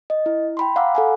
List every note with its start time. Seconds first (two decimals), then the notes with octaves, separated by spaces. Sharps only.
0.10 D#5
0.26 E4
0.57 G5 B5 C6
0.76 F5 F#5 A#5 B5 D6 E6
0.95 A4 F#5 G#5